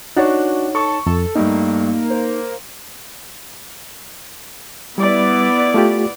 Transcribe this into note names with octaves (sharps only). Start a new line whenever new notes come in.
D4 D#4 F#4 C#5
A4 C#6
F2 A4
G2 A3 A#3 D#4
C5
G3 B3 E4 D5
A3 F4 G4